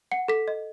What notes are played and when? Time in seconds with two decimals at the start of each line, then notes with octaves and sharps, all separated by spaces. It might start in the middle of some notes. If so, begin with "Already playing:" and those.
0.12 F#5 C#7
0.28 A4 B6
0.48 D#5